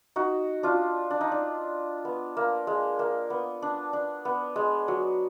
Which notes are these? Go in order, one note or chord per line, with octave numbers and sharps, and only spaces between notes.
D#4 F#4
D4 F4
D4
D#4
D4
B3
A#3
G#3
A#3
B3
D4
D4
B3
G#3
F#3